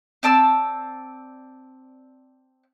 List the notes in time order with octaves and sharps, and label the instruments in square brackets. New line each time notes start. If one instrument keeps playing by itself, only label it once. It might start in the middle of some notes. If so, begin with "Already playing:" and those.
[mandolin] C4 D5 A5 E6